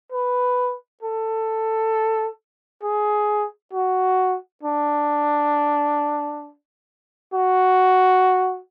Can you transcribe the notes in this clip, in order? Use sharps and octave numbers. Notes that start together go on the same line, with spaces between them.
B4
A4
G#4
F#4
D4
F#4